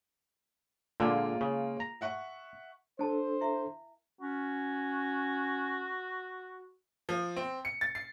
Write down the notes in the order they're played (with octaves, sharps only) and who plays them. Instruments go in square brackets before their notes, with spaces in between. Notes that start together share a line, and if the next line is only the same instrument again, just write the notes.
[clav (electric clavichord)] A#2 D3 [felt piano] G#3 A#3 F4
[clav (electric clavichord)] C#3
A#5
[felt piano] E5 F#5 C#6
[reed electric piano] D4 A4 [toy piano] A#4 A5 [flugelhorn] C5
[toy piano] E4 E5
[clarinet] C#4 [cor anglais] F#4
[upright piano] F3
C4
C#7
A6
C7